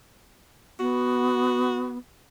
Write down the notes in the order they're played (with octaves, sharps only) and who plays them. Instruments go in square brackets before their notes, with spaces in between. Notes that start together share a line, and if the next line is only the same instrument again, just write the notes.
[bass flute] B3 [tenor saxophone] F#4